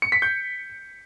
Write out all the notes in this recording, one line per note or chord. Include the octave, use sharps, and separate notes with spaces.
C#7
B6
G6